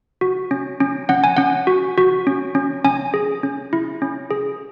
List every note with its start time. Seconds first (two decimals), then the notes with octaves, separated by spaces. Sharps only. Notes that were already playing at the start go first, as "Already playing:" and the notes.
0.21 F#4
0.51 C#4
0.80 C#4
1.09 C#4 F#5
1.24 G#5
1.37 C#4 F#5
1.67 F#4
1.97 F#4
2.27 C#4
2.55 C#4
2.84 C#4 G#5
3.14 G#4
3.43 C#4
3.73 E4
4.02 C#4
4.31 G#4